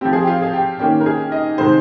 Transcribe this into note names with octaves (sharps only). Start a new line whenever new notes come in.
F3 C4 G4
G#4
G4
F4
G#4
G4
D#3 A#3 C#4 G4
A#4
G#4
D#5
C3 D#3 G#3 C4 C5